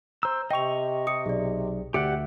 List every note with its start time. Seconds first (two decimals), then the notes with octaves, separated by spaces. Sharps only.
0.23 C5 A#5 E6
0.51 C3 D#5 G5 C#6 F7
1.07 G4 D#6 C#7
1.26 B1 G#4 D5
1.94 D2 G4 D5 E5 F#5 C#7